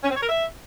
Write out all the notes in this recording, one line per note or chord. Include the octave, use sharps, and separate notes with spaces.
C#4
C4
C#5
A#4
E5